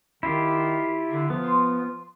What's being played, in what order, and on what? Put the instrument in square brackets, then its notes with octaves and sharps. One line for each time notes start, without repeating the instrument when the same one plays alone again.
[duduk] D#3 [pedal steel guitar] E4 F4 G4 [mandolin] C5
[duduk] D3 [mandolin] A#4 D5
[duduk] F3 [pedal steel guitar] B3
[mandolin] F4 C5 C6